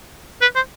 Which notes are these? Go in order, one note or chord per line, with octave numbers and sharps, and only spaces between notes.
B4
C5